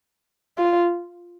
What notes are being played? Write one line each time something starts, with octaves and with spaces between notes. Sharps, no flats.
F4